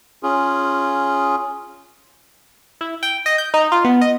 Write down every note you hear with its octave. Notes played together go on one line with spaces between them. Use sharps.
C#4 F4 G#4
E4
G5
D#5
G6
D#4
F4
B3
D#5